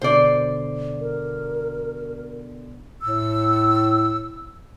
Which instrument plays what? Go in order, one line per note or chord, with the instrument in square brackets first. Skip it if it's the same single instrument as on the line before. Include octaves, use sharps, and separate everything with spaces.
[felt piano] B2 D3 [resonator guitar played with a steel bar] C5 D5
[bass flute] A#4
[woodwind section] A2 E6